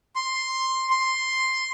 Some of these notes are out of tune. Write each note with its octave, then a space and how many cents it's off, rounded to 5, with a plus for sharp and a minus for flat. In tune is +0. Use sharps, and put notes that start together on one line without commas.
C6 +5
C6 +5